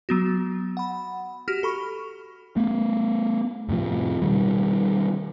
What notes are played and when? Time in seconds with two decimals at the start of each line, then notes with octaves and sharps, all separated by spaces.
0.09 F#3 B3 F#4
0.77 F#5 B5
1.48 F#4 G4 F6
1.63 A4 B5 C#6
2.56 A3 B3
3.68 F2 A2 C3 F3
4.22 B2 D#3 G3